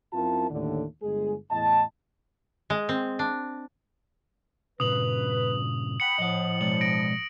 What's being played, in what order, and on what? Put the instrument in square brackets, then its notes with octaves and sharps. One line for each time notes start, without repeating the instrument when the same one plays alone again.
[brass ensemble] F#2 C4 E4 F4 A#4 A5
D#2 A2 D3
G1 G#3 G#4
E2 A2 D#5 A5
[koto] G#3
C4
D4
[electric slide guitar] G2 A#2 C#3 [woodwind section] B4 [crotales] D#6 F#7
[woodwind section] F#5 G5 B5 [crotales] C#7 F#7
[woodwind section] A2 F3 [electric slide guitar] D#5 F#5
[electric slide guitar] B2 G#3 D5 [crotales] F#7
[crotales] A#6 D7